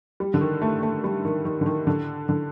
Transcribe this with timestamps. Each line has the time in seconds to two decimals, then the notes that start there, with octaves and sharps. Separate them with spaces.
0.20 G3
0.34 D3
0.41 D#3
0.62 A3
0.83 A3
1.04 G3
1.25 D#3
1.45 D#3
1.61 D3
1.66 D#3
1.87 D3
2.29 D3